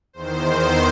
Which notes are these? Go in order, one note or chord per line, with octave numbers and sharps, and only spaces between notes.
E2 D#3 C5